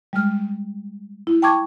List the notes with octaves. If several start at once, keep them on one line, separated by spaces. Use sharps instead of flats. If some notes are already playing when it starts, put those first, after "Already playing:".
G3 G#3 F6
E4
G5 A5 C#6 D6 G#6